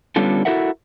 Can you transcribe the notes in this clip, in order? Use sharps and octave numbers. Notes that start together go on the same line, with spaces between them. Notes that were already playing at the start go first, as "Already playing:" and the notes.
D3 G3 B3 C#4 F4 A4
E4 F#4 A4 A#4 E5 F#5